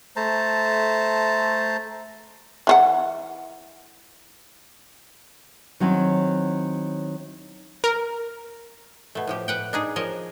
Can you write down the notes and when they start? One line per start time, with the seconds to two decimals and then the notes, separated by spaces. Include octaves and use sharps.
0.16 A3 C5 A5 A#5
2.67 E3 F4 F#5
5.80 D#3 F#3 C4 C#4 E4
7.84 A#4
9.15 B2 A3
9.27 A2 F3 G4
9.48 B4 F#5 G5
9.73 D4 D#4 G#4
9.96 F3 A#4 C#5 D#5